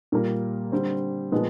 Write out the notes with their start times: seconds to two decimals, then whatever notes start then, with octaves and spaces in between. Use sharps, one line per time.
0.12 A#2 G3 A#3
0.72 D3 G3 C4
1.32 A#2 F3 G#3 B3